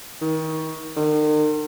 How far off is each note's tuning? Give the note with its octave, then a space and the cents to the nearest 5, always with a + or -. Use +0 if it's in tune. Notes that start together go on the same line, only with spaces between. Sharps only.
D#3 +30
D#3 -40